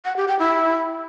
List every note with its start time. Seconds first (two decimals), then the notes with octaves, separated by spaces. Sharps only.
0.05 F#5
0.16 G4
0.28 G5
0.39 E4